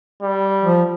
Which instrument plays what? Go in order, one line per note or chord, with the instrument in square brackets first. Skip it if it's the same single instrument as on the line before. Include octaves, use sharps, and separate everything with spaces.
[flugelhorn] G3
[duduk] F3